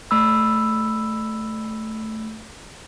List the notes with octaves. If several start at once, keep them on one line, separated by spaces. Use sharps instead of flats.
A3 B5 E6